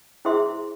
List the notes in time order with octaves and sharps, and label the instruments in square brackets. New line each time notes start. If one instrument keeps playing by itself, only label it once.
[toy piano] E4 G#4 C5 E5 C6